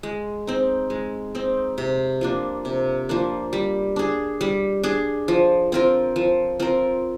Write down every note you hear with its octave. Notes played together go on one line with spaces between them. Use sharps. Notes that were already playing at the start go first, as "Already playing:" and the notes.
G#3
C4 D#4
G#3
C4 D#4
C3
F3 A#3 D4
C3
F3 A#3 D4
G3
D4 G#4
G3
D4 G#4
F3
C4 F4 A#4
F3
C4 F4 A#4